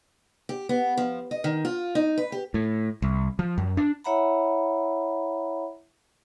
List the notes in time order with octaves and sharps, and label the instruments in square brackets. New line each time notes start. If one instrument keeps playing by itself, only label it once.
[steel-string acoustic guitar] G4
B3
F3
D#5
D#3
F4
D#4
B4
G4
[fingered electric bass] A2
C2
F3
F#2
D4
[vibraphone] E4 C#5 E5 F#5 A#5 B5